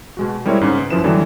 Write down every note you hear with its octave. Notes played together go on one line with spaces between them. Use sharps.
B2 G#3 F#4
G3 G#3 C4 E4 A#4 C#5
G#2 C#3
B3
F#2 F3 E4 B4 E7
D3 E3 F#3 G3 B3